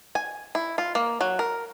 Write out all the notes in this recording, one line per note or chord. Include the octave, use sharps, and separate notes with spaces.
G#5
E4
F4
A#3
F#3
A#4